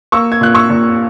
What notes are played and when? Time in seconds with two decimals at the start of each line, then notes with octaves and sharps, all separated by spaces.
0.12 A#3 C#6 E6
0.32 G#6
0.41 A#2 F#6
0.54 C#6 E6
0.70 A#2